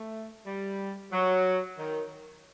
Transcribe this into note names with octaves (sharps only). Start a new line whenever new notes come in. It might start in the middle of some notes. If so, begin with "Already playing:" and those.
Already playing: A3
G3
F#3
D#3